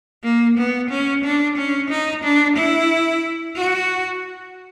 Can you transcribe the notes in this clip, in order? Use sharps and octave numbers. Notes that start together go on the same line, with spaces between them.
A#3
B3
C#4
D4
C#4
D#4
D4
E4
F#4